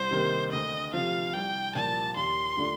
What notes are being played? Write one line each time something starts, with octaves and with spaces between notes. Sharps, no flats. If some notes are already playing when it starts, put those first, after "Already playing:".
Already playing: C2 C5
C3 D#3 A#3
D2 D#5
C3 F3 F5
C2 G5
A#2 F3 A#3 A5
D#2 C6
D3 A3 D4 F4